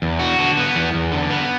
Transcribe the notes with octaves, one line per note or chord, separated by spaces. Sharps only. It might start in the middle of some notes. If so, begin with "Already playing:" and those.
E2
F#4
D3
B3
E2
E2
D3
B3